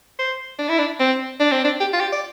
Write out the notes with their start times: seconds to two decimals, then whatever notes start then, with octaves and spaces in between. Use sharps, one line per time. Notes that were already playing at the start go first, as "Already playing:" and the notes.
0.19 C5
0.59 D4
0.69 E4
0.79 D4
0.99 C4
1.40 D4
1.52 C4
1.65 D4
1.80 G4
1.93 F4
2.00 G4
2.12 D5